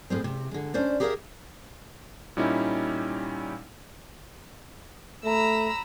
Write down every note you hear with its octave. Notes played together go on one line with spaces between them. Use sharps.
A2 G#3 C4
C3
D3 G#3
C#4 D4 C5 D5
G4 G#4 A#4 B4 E5 F5
A#2 G3 C#4 D#4 E4
A3 A#5 B5 E6